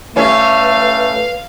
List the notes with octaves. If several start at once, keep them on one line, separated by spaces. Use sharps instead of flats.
G3 A3 C#4 E4 B4 F5